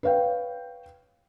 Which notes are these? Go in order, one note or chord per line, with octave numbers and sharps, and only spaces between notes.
B4 C#5 F5 G5